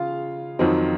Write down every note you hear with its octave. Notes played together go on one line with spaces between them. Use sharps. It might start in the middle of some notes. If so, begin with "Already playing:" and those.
Already playing: C#3 G#3 F4 F5
F2 D#3 F#3 C4 D#4